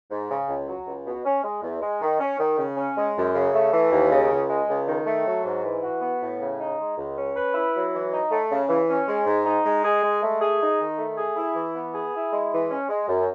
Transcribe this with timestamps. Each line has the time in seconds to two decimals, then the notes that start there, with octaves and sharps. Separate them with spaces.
0.10 G#2
0.30 C#3
0.49 C#2
0.68 F#3
0.87 C#2
1.06 B2
1.25 C#4
1.44 G#3
1.63 E2
1.82 G#3
2.02 D#3
2.20 C#4
2.39 D#3
2.58 C#3
2.77 C#4
2.97 G#3
3.16 F#2
3.35 C#3
3.53 A3
3.73 E3
3.92 D#2
4.11 C#3
4.31 C#2
4.49 G#3
4.69 C#2
4.87 D#3
5.06 A3
5.26 F#3
5.45 G#2
5.64 E3
5.83 F#4
6.02 B3
6.22 A2
6.40 C#3
6.60 D#4
6.79 G#3
6.98 C#2
7.17 C#4
7.37 B4
7.54 E4
7.75 F#3
7.94 E3
8.13 D#4
8.31 A3
8.51 C#3
8.69 E3
8.89 C#4
9.08 G#3
9.26 G#2
9.46 D#4
9.65 G#3
9.84 G#4
10.04 G#3
10.22 A3
10.42 G#4
10.61 D#4
10.80 D#3
10.99 A3
11.17 G#4
11.37 E4
11.56 E3
11.74 B3
11.94 G#4
12.14 E4
12.33 G#3
12.52 E3
12.71 C#4
12.89 G#3
13.09 F#2